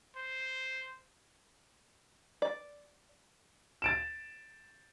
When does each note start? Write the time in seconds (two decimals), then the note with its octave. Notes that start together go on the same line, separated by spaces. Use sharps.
0.16 C5
2.42 D5
3.82 A6 D7 E7